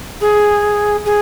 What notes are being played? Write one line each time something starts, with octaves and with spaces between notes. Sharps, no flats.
G#4
G#4